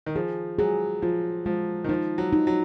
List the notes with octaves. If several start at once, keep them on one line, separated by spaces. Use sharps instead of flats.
D#3
F3 G#4
F#3 G#4
F3 F4
F3 G#3
D#3
F3 D#4
F#3
D#4
F#3